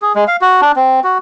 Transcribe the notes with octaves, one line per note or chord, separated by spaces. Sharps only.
G#4
G#3
F5
F#4
D4
C4
F#4